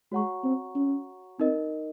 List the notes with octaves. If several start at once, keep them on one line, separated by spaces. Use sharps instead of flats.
G#3 F#4 C#5 F#5 A#5 C#6
C4
C#4
C4 D#4 A#4 D#5